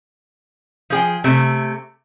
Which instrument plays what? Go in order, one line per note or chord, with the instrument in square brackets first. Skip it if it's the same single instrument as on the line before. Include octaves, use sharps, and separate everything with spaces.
[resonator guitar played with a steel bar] F3 G#4 G5
C3 A3